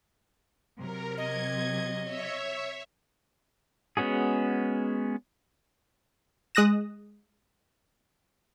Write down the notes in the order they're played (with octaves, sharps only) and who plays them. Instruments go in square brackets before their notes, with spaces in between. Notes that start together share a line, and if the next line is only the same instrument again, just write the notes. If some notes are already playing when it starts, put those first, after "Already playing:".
[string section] C3 F#3 [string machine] A#4
[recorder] D#5 [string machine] G#6
[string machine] C#5 E5
[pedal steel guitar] G#3 B3 C#4 F#4 G#4
[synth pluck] G#3 D#6 F#6 A#6 E7